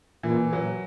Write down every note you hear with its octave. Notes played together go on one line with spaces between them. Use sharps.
A#2 E3
F#3